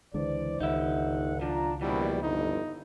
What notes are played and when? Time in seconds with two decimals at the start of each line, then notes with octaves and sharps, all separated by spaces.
0.14 C#2 D3 E3 G#3 C5 D5
0.60 G1 C#2 D#3 D#4 E5 F#5
1.41 B1 F3 D4 F4 A#5
1.81 A#1 B2 E3 G3 E4
2.23 G1 F2 D#4